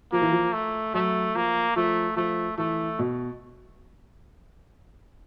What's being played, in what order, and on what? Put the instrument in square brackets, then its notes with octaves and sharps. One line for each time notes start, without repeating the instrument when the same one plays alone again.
[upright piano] F3 [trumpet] A#3
[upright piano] E3
F3
[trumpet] A3
[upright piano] F#3 [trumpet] A3
[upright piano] F3 [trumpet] A#3
[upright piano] F3 [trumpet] A3
[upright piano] F3 [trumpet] A3
[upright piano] E3 [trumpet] A3
[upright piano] B2